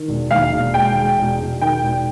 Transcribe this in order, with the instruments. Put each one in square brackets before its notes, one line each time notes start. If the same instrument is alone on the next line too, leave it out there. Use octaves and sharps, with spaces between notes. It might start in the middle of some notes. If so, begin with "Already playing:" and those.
Already playing: [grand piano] D#3
E1
[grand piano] D#2 [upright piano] F5
[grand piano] E1
[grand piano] G#3 [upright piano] G5
[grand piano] G#3
E1
E1
[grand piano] D#3 [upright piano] G5
[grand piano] E1